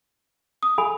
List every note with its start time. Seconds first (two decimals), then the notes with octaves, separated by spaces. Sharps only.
0.63 D#6
0.78 A4 G#5 B5